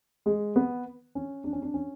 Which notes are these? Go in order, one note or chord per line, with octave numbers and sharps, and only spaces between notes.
G#3
B3
C#4
D4
C#4
D4
C#4